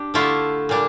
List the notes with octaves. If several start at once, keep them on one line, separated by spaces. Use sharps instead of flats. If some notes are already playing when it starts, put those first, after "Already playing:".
Already playing: D4 G4
D3 A3 E4 F4
A#2 G3 D4